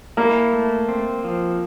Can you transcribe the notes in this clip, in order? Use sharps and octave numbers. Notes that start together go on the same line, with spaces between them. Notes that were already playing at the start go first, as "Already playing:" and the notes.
A#3 E4
A3
C4
F3